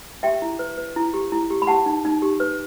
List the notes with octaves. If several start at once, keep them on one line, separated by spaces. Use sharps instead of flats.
G4 E5 G5
E4
B4
B4
E4
G4
E4
G4
B5
G4 F#5 A5
D#4
D#4
G4
B4